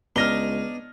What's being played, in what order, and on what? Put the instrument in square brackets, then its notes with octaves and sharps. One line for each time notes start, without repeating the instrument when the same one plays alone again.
[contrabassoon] C#2 [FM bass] B3 [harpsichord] D4 D#4 [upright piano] F6 A#6 G7